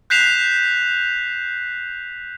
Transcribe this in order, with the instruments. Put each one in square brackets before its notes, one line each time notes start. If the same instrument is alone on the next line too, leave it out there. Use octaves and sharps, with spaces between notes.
[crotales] F#6 G6 B6 C7 E7 F7